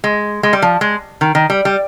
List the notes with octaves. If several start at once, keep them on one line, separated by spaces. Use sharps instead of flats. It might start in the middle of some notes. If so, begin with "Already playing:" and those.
G#3
G#3
G3
F3
G#3
D#3
D#3
G3
G3